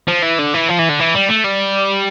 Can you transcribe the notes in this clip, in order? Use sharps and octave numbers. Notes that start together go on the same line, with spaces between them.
F3
E3
D3
E3
F3
E3
D3
E3
G3
A3
G3